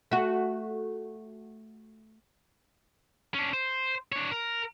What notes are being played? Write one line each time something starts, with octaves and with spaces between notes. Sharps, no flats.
A3 F#4
C#4 D4
C5
D4 C#5
A#4